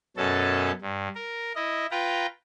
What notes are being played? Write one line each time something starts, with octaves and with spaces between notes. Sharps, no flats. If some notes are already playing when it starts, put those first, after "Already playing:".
F#2 B2 C#4 A4 A5
G2
A#4
E4 D#5
F4 B4 G5 A#5